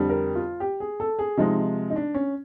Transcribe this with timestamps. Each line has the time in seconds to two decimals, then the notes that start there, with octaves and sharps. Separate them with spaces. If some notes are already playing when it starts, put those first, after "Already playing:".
Already playing: F2 D3 G3
0.10 A#4
0.35 F4
0.60 G4
0.80 G#4
1.00 A4
1.19 G#4
1.37 C3 F3 G#3 D#4
1.90 D#4
1.96 D4
2.14 C#4